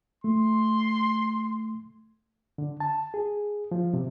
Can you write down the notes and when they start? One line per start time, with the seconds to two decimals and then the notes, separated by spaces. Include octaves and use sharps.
0.24 A3 C6
2.58 D3
2.80 A5
3.14 G#4
3.72 F3
3.94 C3